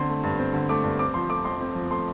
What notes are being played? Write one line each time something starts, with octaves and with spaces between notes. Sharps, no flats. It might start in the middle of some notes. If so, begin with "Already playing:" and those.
Already playing: D3 C4 C6
A3
G2
C4
D3
A3 D6
G2
C4 D6
F3 C6
A3 D6
F2 C6
C4
F3
A3 C6